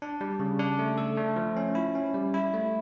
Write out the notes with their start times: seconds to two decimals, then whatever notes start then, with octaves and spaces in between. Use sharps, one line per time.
0.02 D4
0.21 G3
0.40 C#3
0.59 D4
0.79 A3
0.98 A4
1.17 A3
1.36 F3
1.57 C#4
1.75 E4
1.95 C#4
2.14 G3
2.34 E4
2.53 A3